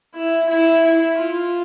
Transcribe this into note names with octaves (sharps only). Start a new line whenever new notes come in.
E4
E4
E4
F4